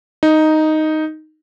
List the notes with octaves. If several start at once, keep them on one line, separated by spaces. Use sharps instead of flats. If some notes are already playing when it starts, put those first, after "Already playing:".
D#4